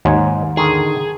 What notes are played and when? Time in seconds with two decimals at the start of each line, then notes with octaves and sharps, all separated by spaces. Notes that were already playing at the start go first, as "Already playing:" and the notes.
0.05 D#2 G#2 C#5
0.57 D3 D#3 G#4